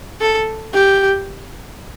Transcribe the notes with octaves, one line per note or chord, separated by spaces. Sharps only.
A4
G4